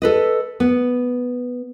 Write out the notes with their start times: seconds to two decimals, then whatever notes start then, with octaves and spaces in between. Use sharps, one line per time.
0.02 A4 B4 D#5
0.60 B3